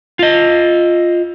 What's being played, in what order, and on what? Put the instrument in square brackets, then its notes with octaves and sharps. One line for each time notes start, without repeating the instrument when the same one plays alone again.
[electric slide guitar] F4 D#5